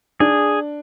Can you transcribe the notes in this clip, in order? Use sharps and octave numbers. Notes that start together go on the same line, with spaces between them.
D4 G#4